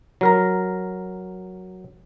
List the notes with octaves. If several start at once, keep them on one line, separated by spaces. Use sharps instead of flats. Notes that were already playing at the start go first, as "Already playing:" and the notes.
F#3 A#4 A#5